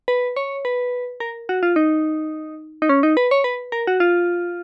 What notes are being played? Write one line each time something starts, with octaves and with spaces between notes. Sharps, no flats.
B4
C#5
B4
A#4
F#4
F4
D#4
D#4
C#4
D#4
B4
C#5
B4
A#4
F#4
F4